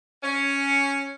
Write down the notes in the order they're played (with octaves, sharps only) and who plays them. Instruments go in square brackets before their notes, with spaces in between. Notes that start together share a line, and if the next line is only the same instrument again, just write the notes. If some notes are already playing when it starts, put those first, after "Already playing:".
[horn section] C#4